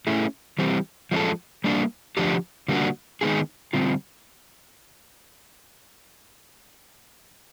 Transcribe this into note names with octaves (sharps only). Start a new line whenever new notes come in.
A3 C#4 E4 G#4
E3 G3 C4
F3 G#3 C#4 E4 A4
G3 A#3 D4
D3 F3 A3 D4 G4
D3 G3 A#3 D4 F#4
D#3 G#3 B3 D#4 G#4
D3 G3 C4 F4